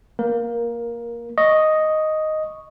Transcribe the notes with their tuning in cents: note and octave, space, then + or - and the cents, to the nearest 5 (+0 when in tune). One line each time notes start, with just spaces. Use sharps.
A#3 +0 A#4 +15
D#5 +0 C#6 +0